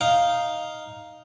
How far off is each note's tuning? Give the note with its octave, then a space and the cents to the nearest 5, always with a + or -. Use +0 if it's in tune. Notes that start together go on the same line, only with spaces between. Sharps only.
D#4 +0 F5 +0